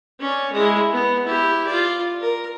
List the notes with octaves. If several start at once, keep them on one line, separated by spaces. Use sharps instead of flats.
C#4 D5
G#3 E4
B3
E4 G4
F4 D5
A#4